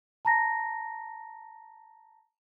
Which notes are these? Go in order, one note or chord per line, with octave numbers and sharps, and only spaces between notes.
A5 A#5 A#6